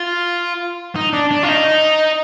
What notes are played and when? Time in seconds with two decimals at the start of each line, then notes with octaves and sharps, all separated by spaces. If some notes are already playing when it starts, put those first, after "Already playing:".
Already playing: F4
0.96 D#4
1.13 D4
1.31 D4
1.43 F4
1.49 D#4